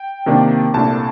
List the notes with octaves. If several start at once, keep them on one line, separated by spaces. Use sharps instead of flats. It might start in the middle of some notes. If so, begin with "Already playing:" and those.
Already playing: G5
C3 D#3 A#3 D4
C2 A#2 A3 D4 A5